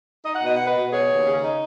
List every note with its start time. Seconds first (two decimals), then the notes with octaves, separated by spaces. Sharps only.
0.24 D#4 D#5
0.35 F#5
0.41 B2 D#5
0.55 B3 F#5
0.66 B4 D#5
0.74 B2
0.92 B3 G#4 C#5
1.09 D#2
1.25 C#3
1.42 D#4